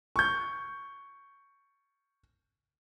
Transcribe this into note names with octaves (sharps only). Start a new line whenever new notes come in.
C#6 G6